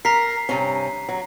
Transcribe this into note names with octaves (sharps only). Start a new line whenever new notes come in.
A#4 A#5 B6 C7
G2 C3 C#4
F#3